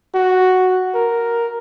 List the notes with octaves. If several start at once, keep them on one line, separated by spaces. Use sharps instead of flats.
F#4
A#4